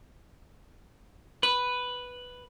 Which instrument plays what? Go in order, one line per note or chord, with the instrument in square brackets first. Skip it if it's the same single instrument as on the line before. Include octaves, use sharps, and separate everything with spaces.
[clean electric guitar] B4